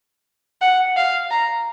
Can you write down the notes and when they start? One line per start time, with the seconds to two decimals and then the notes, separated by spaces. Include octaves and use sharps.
0.61 F#5
0.97 F5
1.31 A#5